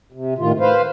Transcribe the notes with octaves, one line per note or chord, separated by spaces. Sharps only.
C3
A2 D#3 F4
B4 C5 F5